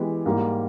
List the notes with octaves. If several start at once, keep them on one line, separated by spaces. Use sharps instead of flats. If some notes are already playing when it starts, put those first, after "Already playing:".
Already playing: E3 G#3 B3 E4 G4
G#2 G3 A#3